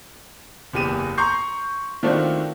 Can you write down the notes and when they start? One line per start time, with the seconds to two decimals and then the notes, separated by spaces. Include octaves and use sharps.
0.73 F#1 E2 G4 G#4 D#7 E7
1.18 A#5 C6 C#6 G6 C7
2.03 D#3 A3 C4 D4 F4 F#4